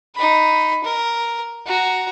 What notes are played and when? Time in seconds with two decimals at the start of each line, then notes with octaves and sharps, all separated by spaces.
0.15 D#4 B5
0.84 A#4
1.66 F#4 A#5